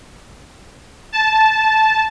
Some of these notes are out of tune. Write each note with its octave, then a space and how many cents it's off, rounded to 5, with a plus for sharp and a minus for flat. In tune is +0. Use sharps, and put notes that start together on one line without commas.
A5 -10